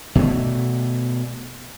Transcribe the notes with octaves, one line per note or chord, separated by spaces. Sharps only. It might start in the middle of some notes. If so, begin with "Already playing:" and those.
B2 A3